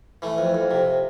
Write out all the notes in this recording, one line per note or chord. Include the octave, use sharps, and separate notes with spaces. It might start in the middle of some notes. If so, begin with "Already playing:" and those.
E3 A3
F2
F2
C3